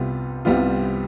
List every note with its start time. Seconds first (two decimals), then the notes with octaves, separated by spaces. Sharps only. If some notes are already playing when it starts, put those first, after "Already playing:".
Already playing: C2 C3 G3 B3 F4
0.45 C2 C3 G3 B3 F4